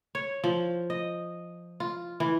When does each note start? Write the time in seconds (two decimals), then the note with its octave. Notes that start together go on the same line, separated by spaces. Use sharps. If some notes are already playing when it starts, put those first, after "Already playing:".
0.15 C#5
0.44 F3
0.90 D#5
1.80 F4
2.20 E3